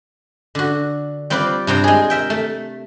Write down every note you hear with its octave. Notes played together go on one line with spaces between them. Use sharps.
D3 F#4
G3 C4 F4 B4 D5
G2 C3 G5 A#5
G#3 G#4
A#4 E5 G5
A3